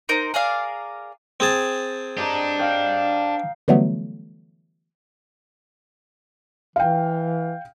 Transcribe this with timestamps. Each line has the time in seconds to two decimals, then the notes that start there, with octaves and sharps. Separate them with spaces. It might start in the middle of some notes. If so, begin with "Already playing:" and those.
0.09 D#4 A#4 C5
0.34 G#4 A#4 D5 F5
1.40 C4 G#4 A5
2.18 D4 G4 D#5 A#5
2.59 D#5 F5 G5
3.68 D3 E3 F#3 G3 A3 B3
6.76 E3 F5 G5